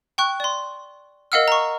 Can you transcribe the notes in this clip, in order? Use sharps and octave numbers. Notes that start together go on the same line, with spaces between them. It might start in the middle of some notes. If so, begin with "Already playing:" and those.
G5 C#6 F#6
D5 C6
A#4 D#5 F5 F#5 E6 F6
A#5 C#6